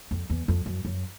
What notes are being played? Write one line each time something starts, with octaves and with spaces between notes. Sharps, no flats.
F2
E2
F2
F#2
F#2